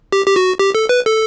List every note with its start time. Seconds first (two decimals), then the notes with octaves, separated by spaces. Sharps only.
0.12 G4
0.26 G4
0.36 F#4
0.59 G4
0.75 A4
0.89 B4
1.06 A4